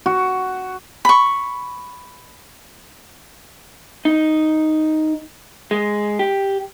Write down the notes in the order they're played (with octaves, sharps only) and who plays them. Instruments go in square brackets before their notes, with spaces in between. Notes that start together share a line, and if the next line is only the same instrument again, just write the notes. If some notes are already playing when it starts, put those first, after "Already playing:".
[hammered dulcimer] F#4
[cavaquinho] B5 C#6
[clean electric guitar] D#4
G#3
G4